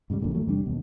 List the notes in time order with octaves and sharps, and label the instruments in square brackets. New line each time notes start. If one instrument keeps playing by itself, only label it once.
[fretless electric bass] G#2 C#3 F#3 G3
A#1 F#2 A#2 D3
E3 F#3 A3
E2 C3 G3 D4
D#2 B2